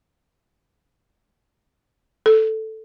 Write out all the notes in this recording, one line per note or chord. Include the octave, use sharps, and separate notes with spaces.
A4